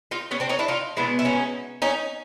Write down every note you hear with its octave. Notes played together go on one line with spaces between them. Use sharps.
D#4 F4
B3 C#4
C4 D4
C#4 D#4
D4 E4
D#4 F4
B2 G#3 B3 D4 E4
E4
C#4 D#4
C#4 D#4